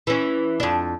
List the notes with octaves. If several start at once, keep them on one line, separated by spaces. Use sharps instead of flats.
E3 C#4
F2 D4